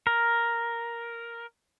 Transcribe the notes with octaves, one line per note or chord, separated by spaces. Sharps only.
A#4